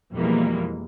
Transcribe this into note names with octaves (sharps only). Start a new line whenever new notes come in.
F2 B2 E3 G3 G#3 A#3